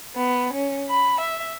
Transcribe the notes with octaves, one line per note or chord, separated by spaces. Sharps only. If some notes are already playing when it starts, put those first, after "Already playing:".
B3
C#4
B5
E5